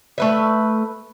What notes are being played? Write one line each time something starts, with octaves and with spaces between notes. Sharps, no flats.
A3 B4 E5